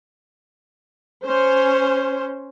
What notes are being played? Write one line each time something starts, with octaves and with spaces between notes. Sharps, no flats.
C#4 C5